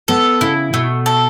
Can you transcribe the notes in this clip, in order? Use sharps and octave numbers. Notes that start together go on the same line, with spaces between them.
B3 A4
C#3 E4
B2 A3
A4